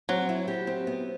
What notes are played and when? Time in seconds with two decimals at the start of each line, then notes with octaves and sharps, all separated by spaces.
0.09 F#3 C4
0.29 E4
0.48 G4
0.67 C4
0.87 B3